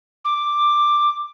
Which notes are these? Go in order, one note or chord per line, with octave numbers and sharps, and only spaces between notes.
D6